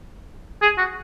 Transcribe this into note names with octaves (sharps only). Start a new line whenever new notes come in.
G#4
F#4